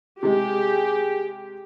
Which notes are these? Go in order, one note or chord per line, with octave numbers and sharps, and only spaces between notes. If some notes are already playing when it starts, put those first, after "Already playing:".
C3 G#3 G4 G#4